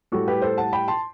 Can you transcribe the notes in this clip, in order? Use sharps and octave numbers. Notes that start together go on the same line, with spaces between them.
A2 G3 F#4 A4
G4 B4
A4 C5
F#5 A5
G5 B5
A5 C6